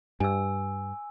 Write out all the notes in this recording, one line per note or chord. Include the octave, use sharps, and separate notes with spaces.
G2 G#5 E6